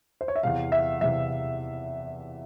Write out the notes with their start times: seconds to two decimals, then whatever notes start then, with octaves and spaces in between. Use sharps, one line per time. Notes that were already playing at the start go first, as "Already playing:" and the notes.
0.21 C5
0.28 C#5
0.36 E5
0.43 E2 C3 E3 F5
0.72 E5
1.01 E2 C3 E3 E5